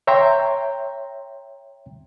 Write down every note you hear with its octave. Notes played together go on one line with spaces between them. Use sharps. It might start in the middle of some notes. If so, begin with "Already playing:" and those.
C#5 E5 G5 A#5 C6